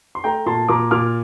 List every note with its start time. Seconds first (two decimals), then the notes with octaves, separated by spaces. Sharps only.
0.15 C6
0.24 A3 G5 A#5
0.46 A#2 A5 C6
0.69 A#2 A#5 D6
0.91 A#2 D6 F6